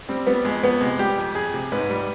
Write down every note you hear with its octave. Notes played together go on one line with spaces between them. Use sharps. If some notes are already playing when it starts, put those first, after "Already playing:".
G3 C4
G3 B3
F2 G#3
F2 B3
C3 G#3
G3 G4
F2
F2 G#4
C3
G#2 B4
G3